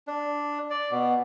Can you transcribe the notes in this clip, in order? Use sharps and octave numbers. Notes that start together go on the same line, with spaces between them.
D4
D5
B2